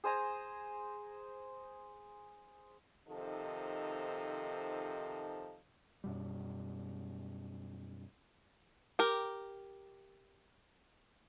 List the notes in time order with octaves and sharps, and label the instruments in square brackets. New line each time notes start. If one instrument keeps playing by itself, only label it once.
[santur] G#4 C5 G#5 A#5
[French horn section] C3 D#3 F3 D#4 A4
[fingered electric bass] F#2 B2 G3
[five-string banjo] G4 A#4